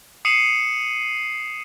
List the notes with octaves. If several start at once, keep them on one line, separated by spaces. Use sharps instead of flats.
D#6 C7 C#7 D#7 E7 F#7